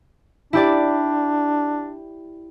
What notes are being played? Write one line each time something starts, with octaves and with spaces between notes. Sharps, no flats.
D4 E4 G4 D5